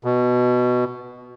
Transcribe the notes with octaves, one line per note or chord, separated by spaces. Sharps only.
B2